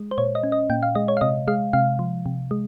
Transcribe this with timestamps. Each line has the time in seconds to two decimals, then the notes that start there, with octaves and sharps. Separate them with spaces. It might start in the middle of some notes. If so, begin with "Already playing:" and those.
Already playing: G#3
0.11 C5
0.18 A#2 C#5
0.35 D#5
0.43 C#4
0.52 D#5
0.70 A#2 G5
0.83 F5
0.95 G#3 D#5
1.08 C#5
1.17 F5
1.21 C3 D#5
1.48 G#3 F5
1.73 C3 F5
1.99 F3
2.26 C3
2.51 G#3